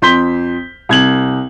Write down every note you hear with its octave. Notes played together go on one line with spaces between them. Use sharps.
F2 C6 G6 B6 G7
C2 G#6 F#7